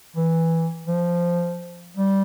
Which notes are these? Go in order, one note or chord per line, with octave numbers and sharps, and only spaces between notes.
E3
F3
G3